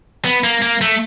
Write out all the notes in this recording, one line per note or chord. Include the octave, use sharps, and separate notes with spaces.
B3
A#3
A#3
A3